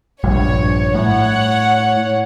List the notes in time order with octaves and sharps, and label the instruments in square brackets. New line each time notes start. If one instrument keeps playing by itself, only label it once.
[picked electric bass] A#1 G2 [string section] C#5
[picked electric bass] A2 [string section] C#5 F#5